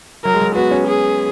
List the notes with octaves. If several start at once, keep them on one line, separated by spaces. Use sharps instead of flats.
F#3 A#4
G#3
F#3
B3 F#4
C#4
G#4